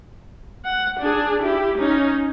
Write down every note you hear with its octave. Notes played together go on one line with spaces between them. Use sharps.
F#5
D4 G#4
E4 G4
C#4 D#4